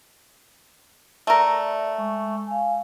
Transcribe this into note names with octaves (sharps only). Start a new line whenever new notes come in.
A3 A#4 D5
G#3 C#6
F5 G#5